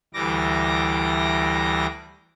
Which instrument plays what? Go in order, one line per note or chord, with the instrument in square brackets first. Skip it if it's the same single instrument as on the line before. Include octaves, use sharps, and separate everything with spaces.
[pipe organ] D2 E3 G3 D6 A#6